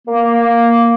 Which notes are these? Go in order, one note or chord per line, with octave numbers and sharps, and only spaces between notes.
A#3